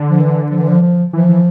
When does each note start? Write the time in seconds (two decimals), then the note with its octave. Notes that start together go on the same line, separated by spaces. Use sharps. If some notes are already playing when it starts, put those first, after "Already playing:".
Already playing: D3
0.10 F3
0.20 E3
0.51 F3
0.60 E3
0.68 F3
0.82 F3
1.13 E3 F3
1.29 E3